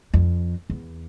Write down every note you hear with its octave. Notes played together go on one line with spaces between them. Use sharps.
F2
E2